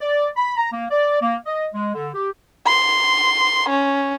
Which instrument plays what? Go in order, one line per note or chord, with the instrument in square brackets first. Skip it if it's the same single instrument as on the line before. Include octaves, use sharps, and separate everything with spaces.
[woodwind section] D5
B5
A#5
A#3
D5
A#3
D#5
G#3
D3
G4
[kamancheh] C6
C#4